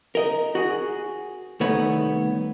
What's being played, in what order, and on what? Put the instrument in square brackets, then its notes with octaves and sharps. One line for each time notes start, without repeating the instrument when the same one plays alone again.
[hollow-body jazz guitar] A#4 D#5
F#4 G#4
C2 D#3 A3 B3 C#5 B5